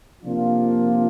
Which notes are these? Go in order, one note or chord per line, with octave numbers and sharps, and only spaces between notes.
C3 F3 A#3 D4 F4